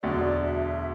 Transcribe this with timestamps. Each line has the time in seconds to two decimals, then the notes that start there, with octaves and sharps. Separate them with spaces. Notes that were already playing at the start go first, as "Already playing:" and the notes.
0.03 E1 D2 D3 F#3 A3 D5
0.43 E5